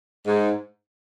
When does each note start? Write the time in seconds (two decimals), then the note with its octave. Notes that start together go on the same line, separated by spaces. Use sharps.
0.27 G#2